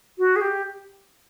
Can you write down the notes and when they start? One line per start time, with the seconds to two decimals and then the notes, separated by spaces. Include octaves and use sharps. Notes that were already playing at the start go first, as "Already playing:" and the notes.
0.18 F#4
0.36 G#4
0.41 G4